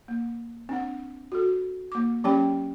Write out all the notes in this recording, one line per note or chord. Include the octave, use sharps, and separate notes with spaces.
A#3
C4 D4 F#5
F#4 A4
A#3 D6
F#3 C#4 G4 C#5 G5 B5